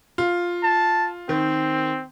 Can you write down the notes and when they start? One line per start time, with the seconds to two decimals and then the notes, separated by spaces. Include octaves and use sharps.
0.18 F4
0.63 A5
1.29 D#3 C4